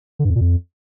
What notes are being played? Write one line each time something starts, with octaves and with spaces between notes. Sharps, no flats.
D3
G2
F2
A#2
F2